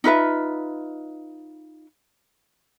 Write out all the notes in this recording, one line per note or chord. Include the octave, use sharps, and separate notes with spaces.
D#4 F4 B4 E5